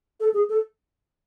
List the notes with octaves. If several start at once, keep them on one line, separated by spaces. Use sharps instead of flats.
A4
G#4
A4